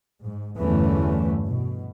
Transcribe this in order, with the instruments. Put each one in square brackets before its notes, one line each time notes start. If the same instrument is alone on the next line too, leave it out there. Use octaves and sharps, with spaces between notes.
[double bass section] G#2
E2 G2 D3 E3 A3 C#4
B2